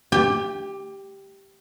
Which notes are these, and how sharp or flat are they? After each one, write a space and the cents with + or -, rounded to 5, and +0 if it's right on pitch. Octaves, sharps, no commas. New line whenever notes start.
G4 +0 G5 +35